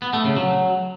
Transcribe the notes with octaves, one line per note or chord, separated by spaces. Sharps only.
B3
A3
C#3
F#3